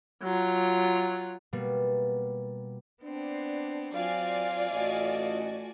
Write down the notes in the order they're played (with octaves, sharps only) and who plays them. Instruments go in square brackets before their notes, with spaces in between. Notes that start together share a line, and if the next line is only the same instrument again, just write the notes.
[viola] F#3 F4
[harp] B2 G3 A#3 B3
[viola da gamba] B3 C4 [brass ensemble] D4
[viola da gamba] F#3 C4 [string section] F4 D5 G#5 [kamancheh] F5
[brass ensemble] A1 D#5 [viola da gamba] A3 F#4